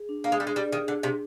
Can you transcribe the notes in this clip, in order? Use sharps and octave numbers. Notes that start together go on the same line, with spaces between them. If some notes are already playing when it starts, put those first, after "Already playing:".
Already playing: G#4
D4
A#3 D4
G#3
G3 D4
G#3
G3 G#4
D#3 G#4
D3 D4
C3 G#4